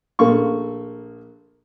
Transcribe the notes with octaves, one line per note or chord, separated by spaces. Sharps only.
A#1 A3 A#3 C#6